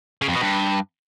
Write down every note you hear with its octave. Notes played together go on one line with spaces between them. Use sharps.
C#3
F2
B2
G2